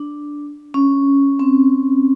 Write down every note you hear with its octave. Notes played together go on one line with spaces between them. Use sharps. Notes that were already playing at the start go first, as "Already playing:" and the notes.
Already playing: D4
C#4
C4